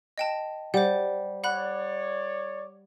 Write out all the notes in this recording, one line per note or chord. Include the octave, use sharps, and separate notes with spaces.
D#5 G5 A5
G3 C5 F#5
C#5 D5 F#5 B5 F#6